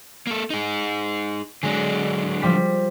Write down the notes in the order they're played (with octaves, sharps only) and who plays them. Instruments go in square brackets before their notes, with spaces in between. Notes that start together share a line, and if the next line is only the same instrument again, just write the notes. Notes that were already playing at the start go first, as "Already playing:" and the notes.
[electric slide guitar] A#3 A4
D#4 G#4
[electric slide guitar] D3 F#3 D4 [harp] G#3
[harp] F3 G3 B6